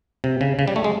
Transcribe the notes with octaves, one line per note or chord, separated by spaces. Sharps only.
C3
C#3
C#3
G3
A3
G#3